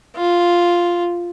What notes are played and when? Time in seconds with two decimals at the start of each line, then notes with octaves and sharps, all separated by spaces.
0.15 F4